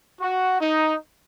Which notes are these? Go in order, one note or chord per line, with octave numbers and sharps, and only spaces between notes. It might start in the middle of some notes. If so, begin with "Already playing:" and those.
F#4
D#4